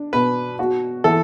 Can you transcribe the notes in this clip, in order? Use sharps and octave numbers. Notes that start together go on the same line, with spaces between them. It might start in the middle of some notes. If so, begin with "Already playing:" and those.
Already playing: D4
B2 B4
F#4
E3 A4